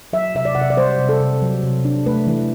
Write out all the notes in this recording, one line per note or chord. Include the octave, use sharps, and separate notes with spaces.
F#3 E5
C3 E5
D5
C3 F#5
E5
D5
G3 C5
C3
A4
C3
F#3
C3
D4
A3 B4
E3